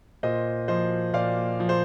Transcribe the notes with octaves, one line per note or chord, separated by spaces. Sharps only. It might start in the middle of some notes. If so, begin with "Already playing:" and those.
A#2 C5 D#5
F3 C5 D#5
A#2 D5 F5
F3
C5